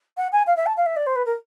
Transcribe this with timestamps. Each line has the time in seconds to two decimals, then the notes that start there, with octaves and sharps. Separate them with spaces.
0.17 F#5
0.32 G#5
0.47 F5
0.57 E5
0.66 A5
0.77 F5
0.86 E5
0.96 D5
1.07 C5
1.16 B4
1.26 A#4